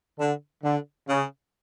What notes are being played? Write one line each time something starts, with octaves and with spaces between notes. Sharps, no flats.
D3
D3
C#3